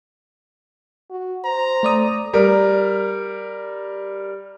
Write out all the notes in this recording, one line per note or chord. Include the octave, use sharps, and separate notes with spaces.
F#4
C5 A#5
A3 D5 D#6
G3 A#4